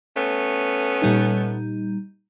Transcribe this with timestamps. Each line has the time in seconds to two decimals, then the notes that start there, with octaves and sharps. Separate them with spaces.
0.16 A3 B3 C#4
1.02 A#2 G3 D#4